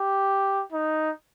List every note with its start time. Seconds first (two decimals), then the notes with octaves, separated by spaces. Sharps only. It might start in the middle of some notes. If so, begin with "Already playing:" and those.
Already playing: G4
0.72 D#4